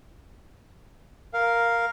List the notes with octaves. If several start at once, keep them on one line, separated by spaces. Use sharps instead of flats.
A#4 F5